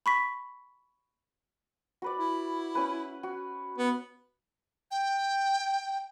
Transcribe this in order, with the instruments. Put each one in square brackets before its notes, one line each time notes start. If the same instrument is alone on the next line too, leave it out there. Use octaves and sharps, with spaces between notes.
[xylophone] B5 C#6 B6
[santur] F#4 B4 D5
[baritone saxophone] E4
[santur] C#4 B4
F#4
[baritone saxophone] B3
[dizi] G5